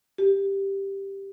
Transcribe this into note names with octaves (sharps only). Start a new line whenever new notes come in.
G4